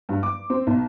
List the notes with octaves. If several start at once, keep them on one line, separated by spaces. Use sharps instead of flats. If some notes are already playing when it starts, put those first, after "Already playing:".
G2
D6
C4
B1